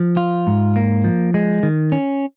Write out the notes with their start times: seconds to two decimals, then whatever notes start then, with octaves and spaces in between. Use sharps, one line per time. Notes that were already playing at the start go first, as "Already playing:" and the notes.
Already playing: F3
0.17 F4
0.47 G#2
0.76 A#3
1.04 F3
1.34 G#3
1.63 D#3
1.92 C#4